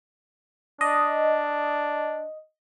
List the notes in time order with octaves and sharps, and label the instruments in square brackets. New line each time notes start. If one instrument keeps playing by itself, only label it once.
[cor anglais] D4 [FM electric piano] D#5